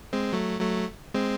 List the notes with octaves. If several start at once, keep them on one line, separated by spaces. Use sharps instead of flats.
G#3 C4
F#3 A3
F#3 A3
G#3 C4